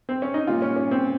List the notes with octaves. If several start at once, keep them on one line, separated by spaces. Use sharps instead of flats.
C4
C#4
D#4
A#2 G3 F4
C#4
C#4
C4